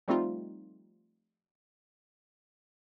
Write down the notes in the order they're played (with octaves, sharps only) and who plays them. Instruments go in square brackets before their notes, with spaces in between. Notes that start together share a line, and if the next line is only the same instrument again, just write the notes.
[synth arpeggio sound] F3 G3 A3 C4 D#4 F4